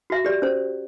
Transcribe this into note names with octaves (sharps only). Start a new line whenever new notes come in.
F#4 E5
G4 D5
C#4 C5